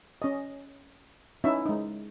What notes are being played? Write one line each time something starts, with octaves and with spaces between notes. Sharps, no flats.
C#4 D#5
C#4 D#4 E4 E5
G#3 D#4